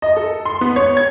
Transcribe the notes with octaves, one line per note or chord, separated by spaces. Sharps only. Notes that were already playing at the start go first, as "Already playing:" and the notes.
D#5
A4
C6
B3
C#5
G#6